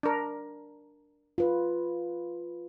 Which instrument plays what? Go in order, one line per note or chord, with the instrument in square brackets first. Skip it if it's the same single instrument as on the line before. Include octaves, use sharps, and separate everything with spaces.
[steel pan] D4 A#4
[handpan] F4 B4